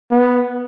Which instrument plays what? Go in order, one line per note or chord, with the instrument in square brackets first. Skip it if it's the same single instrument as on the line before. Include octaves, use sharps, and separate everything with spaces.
[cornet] B3